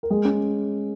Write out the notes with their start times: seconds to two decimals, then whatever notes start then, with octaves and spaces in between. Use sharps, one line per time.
0.03 A#4
0.10 G#3 G#4
0.25 C#4